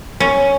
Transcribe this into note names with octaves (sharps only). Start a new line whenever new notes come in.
C#4